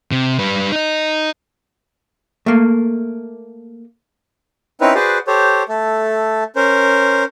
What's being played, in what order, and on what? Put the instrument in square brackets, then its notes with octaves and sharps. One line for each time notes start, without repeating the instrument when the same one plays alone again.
[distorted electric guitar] C3
G3 B4
D#4 D#5
[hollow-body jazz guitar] A3 A#3
[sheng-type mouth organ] C4 C#4 D#4 E4 B4
F#4 G#4 B4 C5 D5
G4 A4 C5 C#5
A3 A4
C#4 A#4 C5